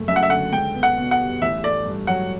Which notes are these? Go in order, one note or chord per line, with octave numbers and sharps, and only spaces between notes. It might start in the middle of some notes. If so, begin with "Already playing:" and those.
Already playing: F#1 A3
F#2 E5
F#5
E5
D3 F#5
C#2 G5
B3
F#5
B2
F#5
G3
A1 E5
A3 D5
G2
F#3 F#5